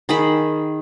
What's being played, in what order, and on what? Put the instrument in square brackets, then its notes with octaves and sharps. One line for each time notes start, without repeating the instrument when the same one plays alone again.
[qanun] D#3 G#4 D#5 B5